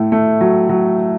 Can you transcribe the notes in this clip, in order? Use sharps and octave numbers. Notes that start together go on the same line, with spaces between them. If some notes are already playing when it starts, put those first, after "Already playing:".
Already playing: A2 A3
A3
F#3
F#3